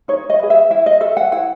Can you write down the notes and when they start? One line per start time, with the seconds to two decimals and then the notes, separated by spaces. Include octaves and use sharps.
0.08 D#4 C#5
0.30 D#5
0.39 G#4 B4
0.50 E5
0.70 E4 E5
0.86 D#5
1.01 A4 E5
1.17 F#5
1.32 E4 F#5